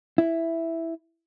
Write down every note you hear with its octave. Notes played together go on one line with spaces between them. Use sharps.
E4